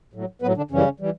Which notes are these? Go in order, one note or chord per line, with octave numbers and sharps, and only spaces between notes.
A2 F#3
A2 F#3 B3 B4
D3 D4
F#2 C#3 E3 G3 C#4
E3 G3